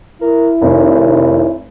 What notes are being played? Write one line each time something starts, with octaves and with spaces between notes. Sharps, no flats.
E4 A#4
F1 D#2